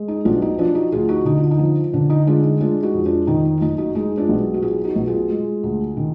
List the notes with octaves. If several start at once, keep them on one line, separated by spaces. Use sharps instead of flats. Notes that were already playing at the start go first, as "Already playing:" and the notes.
Already playing: G#3
D#4
B1 D4 F4
D#4
F3 D4 F4
D#4 F#4
D2 F4 G#4
D#4 F#4
D3 D#4
F4
D#4
F3
D3 D4
D#4
G#3 D4 F4
D#4
G#3 D4 F4
D#4 F#4
F2
D4 F4
D#3 D#4
D#4
F4
F#1 D#4
D#4 F#4
G#3 D#4
D4 F4
B1
F#4
F#3 F4 G#4
D#4 F#4
B1
F4 G#4
G#3
D2
D#3